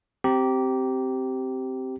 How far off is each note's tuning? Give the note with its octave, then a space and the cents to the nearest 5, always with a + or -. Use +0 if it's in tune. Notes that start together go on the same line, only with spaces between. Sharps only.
C4 +0 G4 -15 A#5 +0